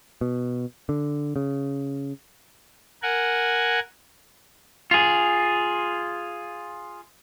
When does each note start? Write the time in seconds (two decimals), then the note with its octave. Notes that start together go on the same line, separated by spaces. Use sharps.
0.21 B2
0.89 D3
1.36 C#3
3.03 A#4 F#5 G#5
4.91 F4 G#4